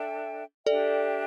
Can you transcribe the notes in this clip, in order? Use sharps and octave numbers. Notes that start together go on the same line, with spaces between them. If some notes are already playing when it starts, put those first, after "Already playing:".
Already playing: D4 A4 E5 G5
D4 G4 A4 D5 E5 G5